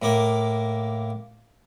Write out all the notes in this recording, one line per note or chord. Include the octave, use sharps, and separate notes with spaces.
A2 A#3 D6